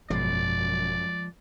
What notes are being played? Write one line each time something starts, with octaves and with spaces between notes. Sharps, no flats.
G#1 F#2 B2 F3 G#3 D5